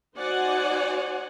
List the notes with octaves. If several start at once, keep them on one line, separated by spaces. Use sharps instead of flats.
D#4 F#4 C5 D5 F#5 G#5